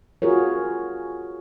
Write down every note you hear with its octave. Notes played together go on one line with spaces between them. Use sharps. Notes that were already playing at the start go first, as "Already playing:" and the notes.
F4 F#4 G#4 A#4 C#5